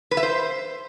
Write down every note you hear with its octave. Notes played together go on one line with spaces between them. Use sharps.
B4
E5
C5